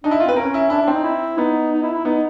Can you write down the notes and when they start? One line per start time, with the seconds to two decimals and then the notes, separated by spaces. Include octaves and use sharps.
0.04 D4 D#4
0.11 E4
0.20 F4
0.26 C4 B4
0.36 C#4 A#4
0.54 E4
0.70 D4 E4
0.82 D4
0.88 C4
0.93 D#4
1.04 E4
1.38 B3 D#4
1.72 D#4
1.82 E4
1.93 E4
2.05 B3 D#4